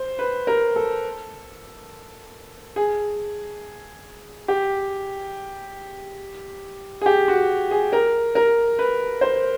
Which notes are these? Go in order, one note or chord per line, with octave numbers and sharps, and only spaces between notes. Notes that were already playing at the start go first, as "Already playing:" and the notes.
Already playing: C5
B4
A#4
A4
G#4
G4
G#4
G4
F#4
G#4
A#4
A#4
B4
C5